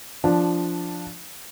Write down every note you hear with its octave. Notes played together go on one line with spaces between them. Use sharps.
F3 D4